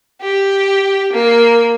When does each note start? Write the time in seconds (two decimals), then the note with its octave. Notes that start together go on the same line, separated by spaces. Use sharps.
0.22 G4
1.13 A#3